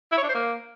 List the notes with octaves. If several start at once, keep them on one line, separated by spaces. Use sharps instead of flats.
E4
C#5
D4
C5
A#3